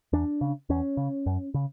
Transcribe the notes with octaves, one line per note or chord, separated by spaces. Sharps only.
E2 D4
C#3
E2 C#4
C#3
F#2
C#3